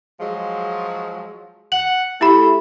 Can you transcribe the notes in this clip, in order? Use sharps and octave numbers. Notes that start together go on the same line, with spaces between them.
F3 F#3 G#3
F#5 F#7
A3 E4 G4 B5